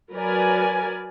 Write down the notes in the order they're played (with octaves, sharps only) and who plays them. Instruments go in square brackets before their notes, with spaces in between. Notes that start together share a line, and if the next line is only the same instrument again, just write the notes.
[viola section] F#3 A#4 B4 D5 G#5